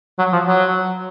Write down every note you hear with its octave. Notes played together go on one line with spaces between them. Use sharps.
F#3
F3
F#3